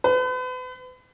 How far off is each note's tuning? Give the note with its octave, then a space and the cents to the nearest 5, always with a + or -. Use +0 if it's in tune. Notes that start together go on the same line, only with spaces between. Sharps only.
B4 +40